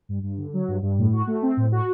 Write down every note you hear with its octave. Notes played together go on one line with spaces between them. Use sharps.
G2
G2
D3
F#3
G2
G2
A2
F#4
A3
C4
A2
F#4